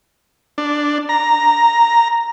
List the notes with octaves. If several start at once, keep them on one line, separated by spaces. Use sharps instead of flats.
D4
A#5